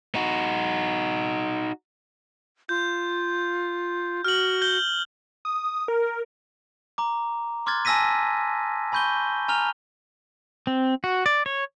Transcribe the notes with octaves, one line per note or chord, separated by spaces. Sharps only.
D#4 F#4
F4 G6
F#4 F6 F#7
G6 G7
D#6
A#4
A#5 D6
C6 D6 F6 F#6 G#6 A6
G#5 A5 E6 A#6 B6 D#7
G#5 B5 C#6 G6 D#7 G7
G#5 A#5 F6 F7 G7
C4
F#4
D5
C#5